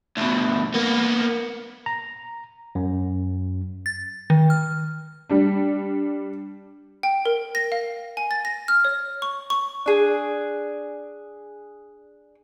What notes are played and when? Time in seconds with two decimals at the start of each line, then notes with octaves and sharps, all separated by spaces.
0.17 D2 B2
0.74 A#3 B3
1.86 A#5
2.75 F#2
3.86 A6
4.30 D#3
4.50 F6
5.30 G3 D4
7.03 G5
7.25 A#4
7.55 A#6
7.72 F5
8.17 G#5
8.31 A6
8.45 A#6
8.68 F6
8.85 C#5
9.22 C#6
9.50 C#6
9.86 D4 G#4